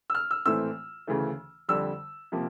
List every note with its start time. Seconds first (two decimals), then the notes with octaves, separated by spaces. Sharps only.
0.10 E6
0.15 F6
0.31 E6
0.46 A#1 A2 E3 A3 C4 E6
1.07 D2 C#3 E3 A3
1.69 F2 D3 G3 E6
2.32 C3 F3 A#3